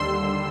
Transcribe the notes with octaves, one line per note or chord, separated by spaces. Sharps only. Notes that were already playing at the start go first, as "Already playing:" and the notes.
Already playing: D#2 D3 G3 C6 E6